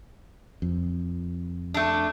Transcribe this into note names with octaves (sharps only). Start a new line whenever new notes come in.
F2
A3 D4